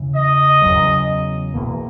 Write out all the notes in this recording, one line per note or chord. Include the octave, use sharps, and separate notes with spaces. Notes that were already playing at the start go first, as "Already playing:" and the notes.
Already playing: E2 C#3 E3
D#5
E2 C#3 F#3
E2 B2 A#3